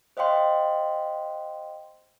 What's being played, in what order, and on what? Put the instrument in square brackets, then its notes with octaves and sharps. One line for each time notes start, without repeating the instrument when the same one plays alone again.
[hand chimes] C5 D#5 F5 G5 C6